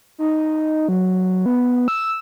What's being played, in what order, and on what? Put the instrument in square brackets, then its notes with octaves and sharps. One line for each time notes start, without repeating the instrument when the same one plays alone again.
[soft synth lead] D#4
F#3
B3
E6